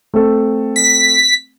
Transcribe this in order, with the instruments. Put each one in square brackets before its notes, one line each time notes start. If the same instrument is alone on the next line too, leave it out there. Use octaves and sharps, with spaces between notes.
[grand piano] A3 C4 A4
[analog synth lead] B6